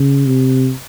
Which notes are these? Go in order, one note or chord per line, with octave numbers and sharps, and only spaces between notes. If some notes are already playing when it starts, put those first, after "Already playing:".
Already playing: C#3
C3